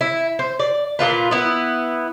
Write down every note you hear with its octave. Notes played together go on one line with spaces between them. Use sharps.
E4
C5
D5
A#2 C#3 F4 B4
B3 E4